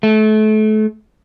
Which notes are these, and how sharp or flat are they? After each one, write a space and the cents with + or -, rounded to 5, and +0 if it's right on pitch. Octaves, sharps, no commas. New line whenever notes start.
A3 -30